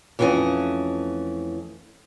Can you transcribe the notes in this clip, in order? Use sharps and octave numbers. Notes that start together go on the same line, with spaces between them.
F2 E3 A3 C#4 D#5